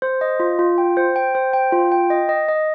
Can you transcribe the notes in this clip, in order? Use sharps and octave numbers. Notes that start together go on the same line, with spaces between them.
C5
D#5
F4
F4
G5
C5
G5
C5
G5
F4
G5
D#5
D#5
D#5